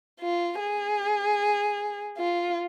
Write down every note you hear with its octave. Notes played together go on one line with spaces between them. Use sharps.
F4
G#4
F4